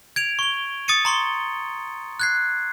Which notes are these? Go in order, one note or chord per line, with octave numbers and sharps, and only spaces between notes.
G#6 D7 F7
C#6 G7
D#6 A6 C#7 D#7
A#5 C6 C#6 G7
F#6 G#6 C7